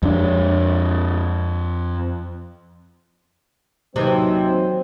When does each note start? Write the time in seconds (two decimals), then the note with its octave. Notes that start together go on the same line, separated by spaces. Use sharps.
0.03 F2 D4
3.96 D#2 C3 E3 F#3 C4 C5